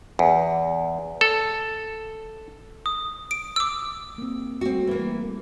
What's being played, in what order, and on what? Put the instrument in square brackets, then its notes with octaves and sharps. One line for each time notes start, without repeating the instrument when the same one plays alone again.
[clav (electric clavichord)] E2
A4
[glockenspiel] D#6
[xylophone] D7
D6 E6
[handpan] A#3 C4
[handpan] G3 A3 [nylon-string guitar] C4 F#4
[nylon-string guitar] E3 A#3